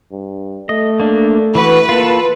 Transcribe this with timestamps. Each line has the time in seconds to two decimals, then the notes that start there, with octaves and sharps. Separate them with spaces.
0.12 G2
0.69 A3 D#5
1.00 A#3 D4
1.55 E3 F#4 B4
1.89 A#3 F4 A4